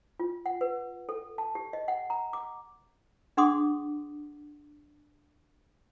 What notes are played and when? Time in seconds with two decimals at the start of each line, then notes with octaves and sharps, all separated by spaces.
0.20 F4
0.46 F#5
0.61 B4
1.09 A4
1.38 A5
1.55 G4
1.73 D#5
1.88 F#5
2.10 A#5
2.33 D6
3.37 D4 G#4 F#5 C6 D6 D#6